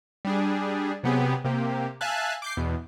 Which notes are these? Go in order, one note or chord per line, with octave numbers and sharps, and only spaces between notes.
G3 D4 G#4
C3 F#3 B3 G4 G#4
C3 A#3 G4
E5 F5 G#5 A5 F#6
D6 G6 C7
E2 B2